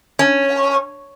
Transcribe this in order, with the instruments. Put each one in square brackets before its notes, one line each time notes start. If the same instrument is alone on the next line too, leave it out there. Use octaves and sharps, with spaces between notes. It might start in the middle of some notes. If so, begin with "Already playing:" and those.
[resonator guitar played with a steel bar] C#4